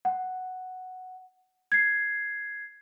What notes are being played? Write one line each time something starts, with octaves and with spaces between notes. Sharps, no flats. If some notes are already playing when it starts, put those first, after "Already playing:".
F#5
G#6 C7